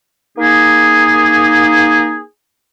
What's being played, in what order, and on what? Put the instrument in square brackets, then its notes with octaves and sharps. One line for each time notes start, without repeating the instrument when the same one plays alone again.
[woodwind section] A#3 D#4 G#4